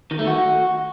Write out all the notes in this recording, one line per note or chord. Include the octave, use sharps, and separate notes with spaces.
D#3
A3
F#4